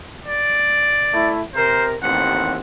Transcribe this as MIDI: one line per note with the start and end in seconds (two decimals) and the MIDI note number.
0.26 1.32 74
1.14 1.42 57
1.14 1.42 64
1.55 1.95 48
1.55 1.95 70
1.55 1.86 72
2.02 2.58 33
2.02 2.58 39
2.02 2.58 60
2.02 2.59 78